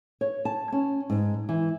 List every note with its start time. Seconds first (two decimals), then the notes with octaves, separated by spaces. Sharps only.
0.21 C#5
0.45 A5
0.72 C#4
1.10 G#2
1.49 E3